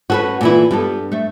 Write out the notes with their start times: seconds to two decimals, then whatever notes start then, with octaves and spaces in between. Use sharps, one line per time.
0.10 A3 C#4 F#4 A4 B4
0.41 A#2 E3 E4
0.71 G2 G3 B3 A4
1.12 A3 E5